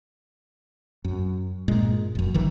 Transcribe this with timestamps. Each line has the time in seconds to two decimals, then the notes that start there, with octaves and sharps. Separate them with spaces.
1.04 F#2
1.68 G2 A#2 G#3
2.15 F1 F#2
2.34 G1 D#3 E3